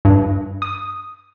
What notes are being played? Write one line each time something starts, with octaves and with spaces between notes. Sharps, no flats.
G2
D#6